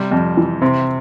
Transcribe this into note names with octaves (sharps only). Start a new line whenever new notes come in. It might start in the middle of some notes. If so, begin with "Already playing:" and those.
Already playing: C3 G3
F2
E3
C3 C4